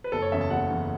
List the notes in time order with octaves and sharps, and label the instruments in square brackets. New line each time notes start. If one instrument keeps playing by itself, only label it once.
[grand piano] B4
F#1 A4
C#5
E2 C#3 E5
A5
F#1 F#5
E2 C#3